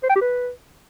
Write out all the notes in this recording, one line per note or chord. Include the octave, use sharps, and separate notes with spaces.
C5
G5
G4
B4